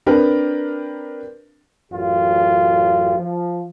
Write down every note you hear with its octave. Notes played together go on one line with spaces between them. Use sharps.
C4 D4 G4 A#4 B4
A1 F#2 F4 G4
F3